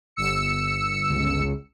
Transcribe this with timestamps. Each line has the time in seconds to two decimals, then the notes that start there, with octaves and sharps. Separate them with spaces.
0.16 G1 E6 C#7
1.10 C#2